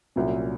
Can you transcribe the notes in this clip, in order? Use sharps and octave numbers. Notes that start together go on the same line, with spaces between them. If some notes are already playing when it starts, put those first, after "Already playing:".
C2 A#2 F#3 C#4